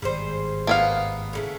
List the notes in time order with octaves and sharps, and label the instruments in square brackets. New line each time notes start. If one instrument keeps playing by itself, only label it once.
[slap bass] G#1 G2 [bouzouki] G3 G#4 C5
[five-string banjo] A#3 B3 F5
[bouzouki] A2 C#3 A3